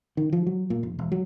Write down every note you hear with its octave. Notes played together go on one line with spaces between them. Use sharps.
D#3
F3
F#3
A#2
F1
E1
F#3